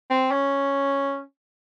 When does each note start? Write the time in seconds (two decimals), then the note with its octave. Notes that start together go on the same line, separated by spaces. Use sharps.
0.10 C4
0.31 C#4